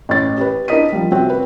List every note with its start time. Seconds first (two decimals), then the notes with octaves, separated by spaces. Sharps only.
0.09 A1 A6
0.38 G4 B4
0.68 D4 E4 A#4 D#5 B6 D#7
0.92 F3 G3
1.12 C3 C4 F#4
1.30 B4